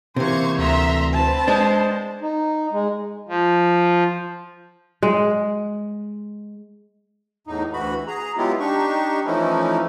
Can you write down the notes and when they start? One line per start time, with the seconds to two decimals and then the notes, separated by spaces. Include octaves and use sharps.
0.16 C3 E3 A#3 C5 C#6 G#6
0.58 D2 E5 A#5 C6
1.13 C4 B4 A5
1.48 G#3 D4 C5
2.22 D#4
2.72 G#3
3.29 F3
5.03 G#3
7.47 E2 A2 D#4
7.73 D2 E3 F#4 B5
8.08 G#4 A#5
8.37 F#3 G#3 B3 E4 F4 G4
8.60 D4 D#4 G4 C#6
9.26 E3 F3 A3 C#4 D#4 E4